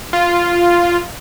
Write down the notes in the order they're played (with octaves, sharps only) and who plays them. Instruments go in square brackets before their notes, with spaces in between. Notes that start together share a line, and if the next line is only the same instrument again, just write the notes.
[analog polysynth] F4